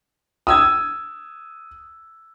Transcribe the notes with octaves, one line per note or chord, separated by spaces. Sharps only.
D#6 E6 G#6